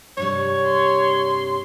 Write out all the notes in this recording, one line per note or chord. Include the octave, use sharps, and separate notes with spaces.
G2 C3 G3 C#5
C6